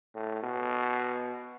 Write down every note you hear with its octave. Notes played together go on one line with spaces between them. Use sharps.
A2
B2